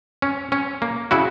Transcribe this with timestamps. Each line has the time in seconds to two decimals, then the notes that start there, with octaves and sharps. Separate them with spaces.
0.22 C#4
0.52 C#4
0.82 A#3
1.11 C#3 E4 F#4